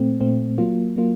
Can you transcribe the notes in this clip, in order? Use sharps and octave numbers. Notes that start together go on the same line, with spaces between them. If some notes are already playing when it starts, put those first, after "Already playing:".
Already playing: A#2 A3 C4
A#2 A3 C4
F#3 A#3 F4
F#3 A#3 F4